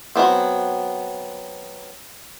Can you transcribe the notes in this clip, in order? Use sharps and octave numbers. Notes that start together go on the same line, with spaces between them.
F#3 A3 B3 C4